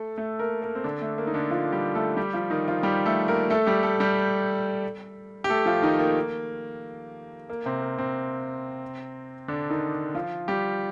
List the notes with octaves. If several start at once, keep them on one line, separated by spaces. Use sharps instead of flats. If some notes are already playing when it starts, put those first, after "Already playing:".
Already playing: A3 A4
A3 A4
A#3 A#4
A#3 A#4
C4
D3 D4
A3
A#3
D#4
D3 D4
F3 F4
G3 G4
A3 A4
G3 G4
F3 F4
D#3 D#4
F3 F4
G3 G4
A3 A4
A#3 A#4
A3 A4
G3 G4
A3 A4
G3 G4
G4
A3 A4
F3 F4
D#3 D#4
A#3
A#3
C3 C4
A#3
C3 C4
D3 D4
D#3 D#4
F3 F4
G3 G4